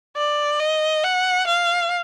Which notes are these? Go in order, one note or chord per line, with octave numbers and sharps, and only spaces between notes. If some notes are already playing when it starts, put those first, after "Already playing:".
D5
D#5
F#5
F5